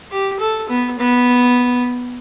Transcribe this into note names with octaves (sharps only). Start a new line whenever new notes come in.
G4
A4
B3
B3